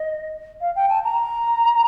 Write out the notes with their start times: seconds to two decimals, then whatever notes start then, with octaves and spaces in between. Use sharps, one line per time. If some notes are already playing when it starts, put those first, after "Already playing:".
Already playing: D#5
0.61 F5
0.75 G5
0.90 A5
1.04 A#5